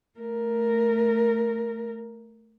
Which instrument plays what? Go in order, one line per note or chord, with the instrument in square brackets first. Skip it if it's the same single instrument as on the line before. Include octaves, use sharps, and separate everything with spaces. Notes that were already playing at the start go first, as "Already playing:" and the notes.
[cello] A3 A#4